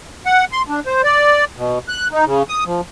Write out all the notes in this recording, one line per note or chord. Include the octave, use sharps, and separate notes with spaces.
F#5
C6
D4
C5
D5
B2
F#6
D#4
C#3
D#6
F3